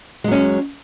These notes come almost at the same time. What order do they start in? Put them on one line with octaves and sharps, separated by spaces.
G#3 F#3 C#4